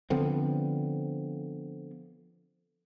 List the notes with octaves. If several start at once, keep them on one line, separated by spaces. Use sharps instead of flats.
D3 F3 B3 C4